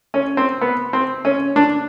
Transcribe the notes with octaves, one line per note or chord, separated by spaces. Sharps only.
C#4
C4
B3
C4
C#4
D4